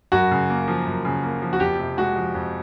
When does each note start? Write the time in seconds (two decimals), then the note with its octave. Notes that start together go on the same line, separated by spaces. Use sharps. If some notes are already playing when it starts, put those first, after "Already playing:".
0.12 F#2 F#4
0.31 C#3
0.50 A#3
0.68 F3
0.86 F#2
1.05 C#3
1.23 A#3
1.42 F3
1.53 F#4
1.60 F2 G4
1.79 C3
1.97 G#3 F#4
2.16 F3
2.35 F2